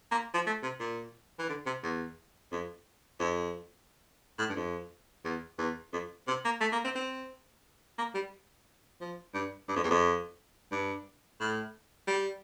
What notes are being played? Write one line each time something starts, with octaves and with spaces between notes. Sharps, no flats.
A#3
F3
A3
C3
A#2
E3
D3
C3
E2
F2
F2
A2
G2
F2
E2
E2
F2
C3
A#3
A3
A#3
C4
C4
A#3
G3
F3
G2
G2
F2
E2
F2
G2
A2
G3